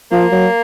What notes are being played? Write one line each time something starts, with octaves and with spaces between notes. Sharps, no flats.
F3 A#3
F#3